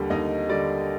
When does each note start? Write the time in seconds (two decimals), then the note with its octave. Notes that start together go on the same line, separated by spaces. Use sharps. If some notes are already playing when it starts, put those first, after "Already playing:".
Already playing: D#2 D3 G3
0.10 D#2 D#4 D#5
0.49 D3 G3 D5